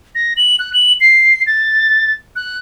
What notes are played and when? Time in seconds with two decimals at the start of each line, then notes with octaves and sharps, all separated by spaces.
0.15 A#6
0.37 F#7
0.59 F#6
0.74 F#7
1.01 C7
1.47 A6
2.36 F#6